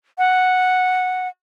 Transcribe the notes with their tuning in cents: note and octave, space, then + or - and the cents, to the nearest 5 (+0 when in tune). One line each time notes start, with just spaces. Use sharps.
F#5 -5